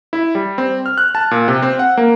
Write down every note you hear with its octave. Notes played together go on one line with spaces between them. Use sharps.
E4
G3
C4
F6
F#6
A5
A#2
C3
C4
F#5
A#3